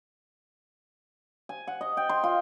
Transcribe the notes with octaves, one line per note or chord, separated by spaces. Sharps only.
G#5
F#5
D#5
G5
C6
F4